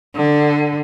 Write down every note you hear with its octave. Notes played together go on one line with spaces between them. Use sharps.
D3